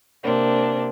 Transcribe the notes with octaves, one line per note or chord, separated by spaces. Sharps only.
C3 A#3 C4 D4